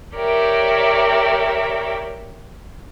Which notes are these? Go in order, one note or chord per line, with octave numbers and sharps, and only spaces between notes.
G4 A#4 C#5 D5 E5 G5